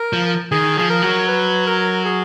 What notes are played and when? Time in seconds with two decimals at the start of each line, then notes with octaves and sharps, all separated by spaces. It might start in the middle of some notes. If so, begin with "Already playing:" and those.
Already playing: A#4
0.13 F3
0.52 D#3 G#4
0.77 F3 G#4
0.90 A#4
1.02 F#3
1.28 B4
1.67 A#4
2.05 G#4